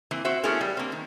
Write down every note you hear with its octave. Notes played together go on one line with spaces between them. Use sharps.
E3 A#3 C4
C4 F#4 C5 E5
A3 B3 C#4 E4 G#4 A#4
G3
A#3 C4
D#3